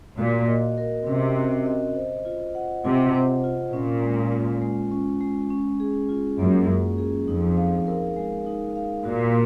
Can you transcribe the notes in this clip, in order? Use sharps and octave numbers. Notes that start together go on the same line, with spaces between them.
A#2 F#4
D#5
A#4
C3 C#4
F#4
D#5
C5
F4
F#5
C3 F4
C5
F4
A#2 C#4
G#3
F4
G#3
C#4
G#3
C#4
G#4
F4
F#2 A#3
C#4
G#4
F2 D#4
F5
A#4
G#3
D#4
F5
A#2 F#4